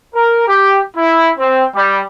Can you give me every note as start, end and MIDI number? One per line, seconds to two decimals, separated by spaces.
0.14 0.47 70
0.48 0.79 67
0.96 1.30 64
1.38 1.64 60
1.75 2.00 55